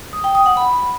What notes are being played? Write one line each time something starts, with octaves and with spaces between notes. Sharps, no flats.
D#6
G5
D#6
F#5
B5